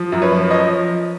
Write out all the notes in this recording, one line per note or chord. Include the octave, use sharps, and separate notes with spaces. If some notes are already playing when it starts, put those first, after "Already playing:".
Already playing: F3
F#2
B4 C#5
F3
F3 C#5 D#5